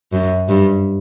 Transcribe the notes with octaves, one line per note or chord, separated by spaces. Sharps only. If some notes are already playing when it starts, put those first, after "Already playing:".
F#2
G2